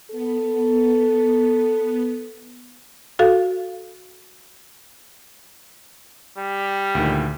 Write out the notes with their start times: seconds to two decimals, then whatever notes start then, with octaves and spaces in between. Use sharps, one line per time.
0.11 B3 A4
3.19 F#4 A4 F5
6.38 G3
6.95 D2 A#2 D#3